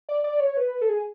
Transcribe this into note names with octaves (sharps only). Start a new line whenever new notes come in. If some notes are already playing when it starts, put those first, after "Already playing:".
D5
D5
C#5
B4
A4
G#4